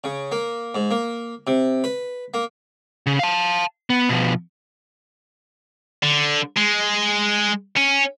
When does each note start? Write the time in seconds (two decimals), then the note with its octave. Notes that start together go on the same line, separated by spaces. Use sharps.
0.04 C#3
0.32 A#3
0.75 G#2
0.91 A#3
1.47 C3
1.84 B4
2.34 A#3
3.06 C#3
3.19 F5 A5
3.90 B3
4.09 B2 F3
6.03 D3
6.57 G#3
7.76 C#4